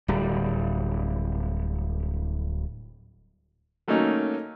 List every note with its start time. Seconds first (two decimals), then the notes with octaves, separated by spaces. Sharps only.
0.08 D1 G3
3.88 F#3 A3 A#3 C#4 D#4